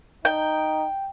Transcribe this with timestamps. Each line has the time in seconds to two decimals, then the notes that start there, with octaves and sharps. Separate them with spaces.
0.25 D#4 G5